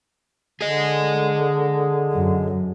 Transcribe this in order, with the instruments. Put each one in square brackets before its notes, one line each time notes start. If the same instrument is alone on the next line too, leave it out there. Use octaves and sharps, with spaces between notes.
[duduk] D3 [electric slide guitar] G#4 D#5
[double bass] F#2